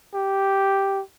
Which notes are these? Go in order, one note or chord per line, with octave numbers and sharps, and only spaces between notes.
G4